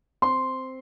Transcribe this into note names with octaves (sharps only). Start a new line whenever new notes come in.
C4 C6